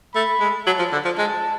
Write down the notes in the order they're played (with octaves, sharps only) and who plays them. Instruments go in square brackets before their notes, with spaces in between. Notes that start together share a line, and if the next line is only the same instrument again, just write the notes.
[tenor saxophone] A3 [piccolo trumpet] B5
[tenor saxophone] G#3
[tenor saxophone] F#3 [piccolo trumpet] A5
[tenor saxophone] F3
D3
F3
[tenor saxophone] G#3 [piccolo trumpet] A5